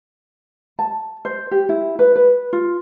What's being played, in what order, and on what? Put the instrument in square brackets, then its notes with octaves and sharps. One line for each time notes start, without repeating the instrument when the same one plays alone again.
[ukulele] A5
C5
G4
E4
B4
B4
F4